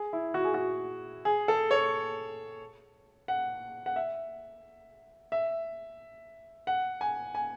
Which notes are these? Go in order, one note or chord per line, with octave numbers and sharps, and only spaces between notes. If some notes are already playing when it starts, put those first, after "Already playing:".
Already playing: G#4
E4
F#4
G#4
F#4
G#4
A4
C#5
F#5
F#5
E5
E5
F#5
G#5
G#5